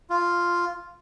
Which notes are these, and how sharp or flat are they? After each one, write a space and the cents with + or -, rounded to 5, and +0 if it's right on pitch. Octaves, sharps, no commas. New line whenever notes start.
F4 +0